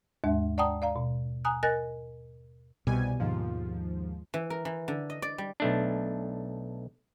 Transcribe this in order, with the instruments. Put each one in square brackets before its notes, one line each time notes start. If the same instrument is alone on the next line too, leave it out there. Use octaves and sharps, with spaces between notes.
[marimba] D#2 G#2 G#3 D4 E5
D5 F#5 G5 A5 A#5 D#6
D5 F5 A#5
B2
G#5 A#5 D#6 F#6
A#4 D#5 G#5 F#6 A6 A#6
[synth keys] C2 G3 G#5 [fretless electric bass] B2
[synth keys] D#2 G#2 F3
[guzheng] E3
A#4
E3
D3
D#5
D5
G3
[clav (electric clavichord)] B1 A3 D4